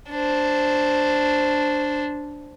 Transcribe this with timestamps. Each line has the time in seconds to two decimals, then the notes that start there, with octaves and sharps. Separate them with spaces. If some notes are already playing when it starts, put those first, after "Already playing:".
0.10 D4 C5